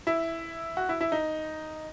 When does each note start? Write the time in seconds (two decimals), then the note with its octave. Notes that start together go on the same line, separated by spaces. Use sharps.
0.07 E4
0.77 F#4
0.89 E4
1.01 E4
1.12 D#4